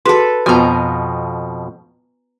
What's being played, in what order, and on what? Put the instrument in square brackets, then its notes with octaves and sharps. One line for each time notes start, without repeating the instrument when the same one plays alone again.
[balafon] F#4 G#4 C6 [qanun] A4 B4
[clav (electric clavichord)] F2 B2 F3 [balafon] B3 F4 F#4 [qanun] G#5 A#5